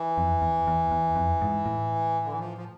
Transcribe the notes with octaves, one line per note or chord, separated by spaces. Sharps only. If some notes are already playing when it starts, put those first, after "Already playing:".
Already playing: E3
F2
E2
E2
E2
F2
G#2
A2
D3
E3
F3
F3